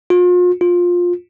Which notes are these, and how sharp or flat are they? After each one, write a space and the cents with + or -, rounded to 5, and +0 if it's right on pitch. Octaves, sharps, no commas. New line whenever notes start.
F4 +40
F4 +15